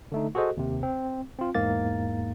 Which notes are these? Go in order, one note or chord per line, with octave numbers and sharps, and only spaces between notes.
D3 A3 D#4
F#4 G#4 A4 C5 D#5
D#2 C3
C4
C4 F4
E2 G#2 A#3 A6